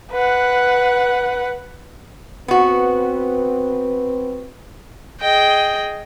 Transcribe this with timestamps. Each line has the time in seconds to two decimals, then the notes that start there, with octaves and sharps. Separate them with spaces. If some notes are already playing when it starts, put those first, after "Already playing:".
0.12 B4 F#5
2.48 B3 C4 F#4 B4
5.21 G#4 D#5 G5